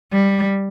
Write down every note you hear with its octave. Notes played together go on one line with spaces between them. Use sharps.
G3